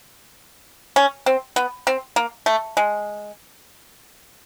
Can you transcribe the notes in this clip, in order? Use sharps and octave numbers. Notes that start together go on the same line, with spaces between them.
C#4
C4
B3
C4
A#3
A3
G#3